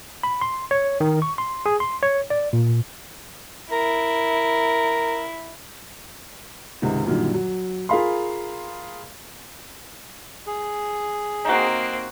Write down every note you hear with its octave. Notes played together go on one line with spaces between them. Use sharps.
B5
C6
C#5
D#3
C#6
C6
G#4
C6
C#5
D5
A#2
E4 A#4
C#2 G#2 C3 D#3
F#2 A#2 D3 D#3 G3
F#3
F4 G#4 A#4 F5 B5 C6
G#4
A#3 C4 D#4 F#4